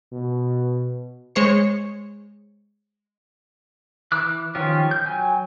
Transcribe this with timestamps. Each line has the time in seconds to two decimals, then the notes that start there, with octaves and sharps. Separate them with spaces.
0.13 B2
1.35 G#3 C5 C#5 C#7
4.12 E3 D6 F#6
4.55 D#3 F3 C#4 F4 G4
4.91 G6
5.06 F#3 G5 G#5